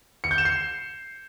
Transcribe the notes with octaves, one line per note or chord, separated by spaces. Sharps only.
C#7
G6
E7
C7